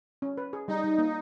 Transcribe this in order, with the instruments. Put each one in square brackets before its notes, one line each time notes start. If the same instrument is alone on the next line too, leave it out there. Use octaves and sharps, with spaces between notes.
[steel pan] C#4
B4
G#4
[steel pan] G3 [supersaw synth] D#4
[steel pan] G3
A#3